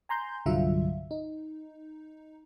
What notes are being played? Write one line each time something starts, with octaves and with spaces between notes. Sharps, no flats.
G#5 A#5 C6 G6
C2 G2 D3 F#3 F4 E5
D#4